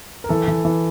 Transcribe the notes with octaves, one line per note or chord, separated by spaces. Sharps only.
A#4
E3 A4
E3
E3